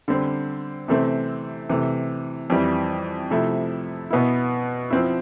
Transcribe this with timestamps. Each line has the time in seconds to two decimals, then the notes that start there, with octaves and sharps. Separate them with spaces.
0.08 D3 G3 C4
0.88 C3 E3 A3 C4
1.69 C3 E3 A3
2.50 F2 E3 G3
3.31 C3 F3 A3 E4
4.10 B2 B3 E4
4.90 F3 C4 E4